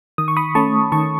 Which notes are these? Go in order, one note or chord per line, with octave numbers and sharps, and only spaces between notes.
D#3 D#6
C#6
B5 D#6
A3 C#4 A5 C#6
D#3 A5 C#6